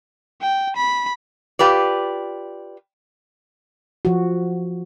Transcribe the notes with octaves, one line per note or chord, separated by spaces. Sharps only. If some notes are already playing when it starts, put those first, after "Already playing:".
G5
B5
F4 G4 B4 D5
F3 F#4